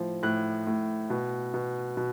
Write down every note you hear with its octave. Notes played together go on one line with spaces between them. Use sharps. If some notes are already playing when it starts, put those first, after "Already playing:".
Already playing: A2 F3
A2 F#6
A2
B2
B2
B2